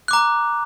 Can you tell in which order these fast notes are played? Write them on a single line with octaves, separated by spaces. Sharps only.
F#6 D6 A#5